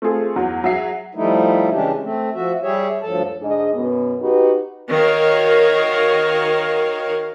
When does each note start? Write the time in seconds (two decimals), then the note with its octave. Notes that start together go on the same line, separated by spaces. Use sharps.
0.02 A3 C4 F4 G#4 A4
0.36 E2 F#3
0.64 F#3 G#4 E5 C7
1.15 F3 G3 A3 D#4 E4
1.71 C#3 E3 G#3 C#4 D4 G4
2.01 A3 C4
2.34 F3 F#4 E5
2.62 G3 G4 G#4 C#5 E5
3.03 D2 G2 F3 F#3 A4 A5
3.42 G#2 D3 D4 G#4 D#5
3.75 F#2 B2 B3
4.22 D#4 F#4 G4 B4
4.89 D#3 F#4 A#4 C#5 D#5 F5